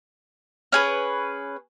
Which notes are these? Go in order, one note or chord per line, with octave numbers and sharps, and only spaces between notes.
C#4 G#4 B4